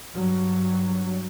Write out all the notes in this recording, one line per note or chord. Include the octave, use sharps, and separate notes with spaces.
G2 F#3